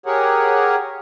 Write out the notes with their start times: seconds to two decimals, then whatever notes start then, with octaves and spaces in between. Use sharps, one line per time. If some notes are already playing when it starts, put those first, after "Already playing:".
0.06 G4 G#4 A#4 C#5 F#5